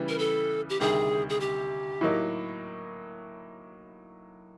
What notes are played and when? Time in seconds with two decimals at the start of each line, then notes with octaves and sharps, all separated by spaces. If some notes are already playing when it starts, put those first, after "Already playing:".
Already playing: C#3 E3 G3 B3
0.09 A#4
0.19 A4
0.70 G4
0.80 D2 C3 D#3 G3 G#4
1.30 G#4
1.40 G4
2.01 A2 F#3 A#3 D#4